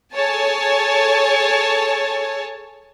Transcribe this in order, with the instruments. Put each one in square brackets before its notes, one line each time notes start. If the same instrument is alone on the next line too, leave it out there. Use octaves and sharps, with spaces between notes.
[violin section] G#4 A4 C#5 G#5 A5